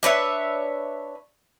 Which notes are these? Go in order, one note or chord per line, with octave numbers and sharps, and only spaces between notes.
D4 B4 C#5 E5